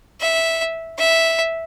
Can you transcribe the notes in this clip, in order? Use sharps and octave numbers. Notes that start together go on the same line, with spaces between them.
E5
E5